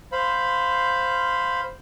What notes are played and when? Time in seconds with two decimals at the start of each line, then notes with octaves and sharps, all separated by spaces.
0.12 C5 F5 B5